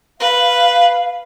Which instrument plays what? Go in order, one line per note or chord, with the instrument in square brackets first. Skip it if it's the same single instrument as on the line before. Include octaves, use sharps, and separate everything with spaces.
[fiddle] B4 [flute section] F5